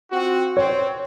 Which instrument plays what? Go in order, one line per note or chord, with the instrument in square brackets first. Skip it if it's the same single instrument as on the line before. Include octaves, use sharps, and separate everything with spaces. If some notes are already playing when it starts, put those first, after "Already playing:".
[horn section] C4 F4 F#4
[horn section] C4 [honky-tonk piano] C#5